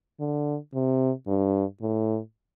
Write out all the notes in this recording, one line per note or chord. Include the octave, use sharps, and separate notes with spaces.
D3
C3
G2
A2